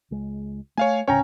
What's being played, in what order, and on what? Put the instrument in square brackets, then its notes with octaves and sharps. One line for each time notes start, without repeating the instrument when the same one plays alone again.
[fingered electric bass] C#2 G#3
[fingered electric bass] A3 [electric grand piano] C#5 F5 G#5
[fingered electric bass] D2 A2 C#3 [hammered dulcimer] C#4 [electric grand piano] C#5 G5 A#5